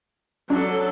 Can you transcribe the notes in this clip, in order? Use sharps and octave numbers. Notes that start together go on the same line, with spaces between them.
F#3 D4 A4